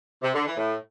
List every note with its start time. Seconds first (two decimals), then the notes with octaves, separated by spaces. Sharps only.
0.22 C3
0.34 D3
0.46 E3
0.57 A2